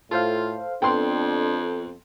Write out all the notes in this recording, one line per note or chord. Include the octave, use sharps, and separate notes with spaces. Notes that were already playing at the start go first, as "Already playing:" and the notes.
A2 F4 A4 C5 F5
F2 B3 D4 A4 G5 C6